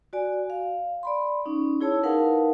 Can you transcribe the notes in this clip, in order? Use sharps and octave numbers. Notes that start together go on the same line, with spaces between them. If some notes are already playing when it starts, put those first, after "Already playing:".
F#4 D5 G#5
F5
D5 B5 C6
C#4 D#4
E4 G#4 C#5 A5 E6
D#4 A#4 B4 F5 F#5 A5